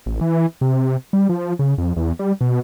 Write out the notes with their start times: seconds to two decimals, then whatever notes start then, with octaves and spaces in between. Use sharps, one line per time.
0.06 A1
0.21 E3
0.61 C3
1.13 G3
1.29 F3
1.59 C#3
1.78 F2
1.96 E2
2.19 G3
2.41 B2